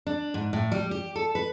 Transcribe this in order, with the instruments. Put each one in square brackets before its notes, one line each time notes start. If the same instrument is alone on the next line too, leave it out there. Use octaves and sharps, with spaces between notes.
[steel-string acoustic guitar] D4
G#2
A2
G3
G4
A4
B4